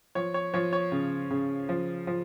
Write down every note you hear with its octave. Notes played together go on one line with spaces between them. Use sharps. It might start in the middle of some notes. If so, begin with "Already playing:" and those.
F3 C#5
C#5
F3 C#5
C#5
C#3
C#3
F3
F3